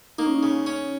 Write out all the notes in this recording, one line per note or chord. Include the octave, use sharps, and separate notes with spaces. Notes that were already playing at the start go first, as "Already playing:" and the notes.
A#3 D#4
C#4
D#4
C#3
C#4